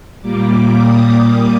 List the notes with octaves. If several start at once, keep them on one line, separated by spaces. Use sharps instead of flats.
A#2 G3 A#3 D6
D#6